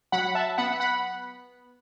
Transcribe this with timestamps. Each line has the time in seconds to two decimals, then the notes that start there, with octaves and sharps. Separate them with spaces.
0.12 F#3 F#5 B5
0.35 E5 A5
0.58 B3 F#5 B5
0.80 F#5 B5